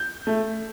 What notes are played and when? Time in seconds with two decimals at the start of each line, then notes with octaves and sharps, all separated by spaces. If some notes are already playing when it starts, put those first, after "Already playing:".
Already playing: G6
0.27 A3